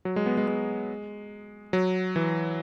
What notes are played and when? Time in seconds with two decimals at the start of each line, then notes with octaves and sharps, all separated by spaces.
0.05 F#3
0.16 G#3
0.26 B3
0.37 G#3
0.48 G#3
1.73 F#3
2.16 E3